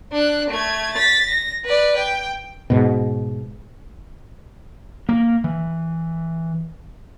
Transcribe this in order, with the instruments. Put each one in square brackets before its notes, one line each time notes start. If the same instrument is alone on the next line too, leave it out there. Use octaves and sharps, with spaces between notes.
[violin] D4 F#6
A3 G#6
A6 B6
A#6
B4 D5
G5
[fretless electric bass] G#2 B2
[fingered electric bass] A#3
E3